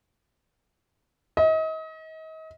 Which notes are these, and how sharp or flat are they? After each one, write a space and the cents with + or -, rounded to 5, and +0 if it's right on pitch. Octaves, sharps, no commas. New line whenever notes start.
D#5 +35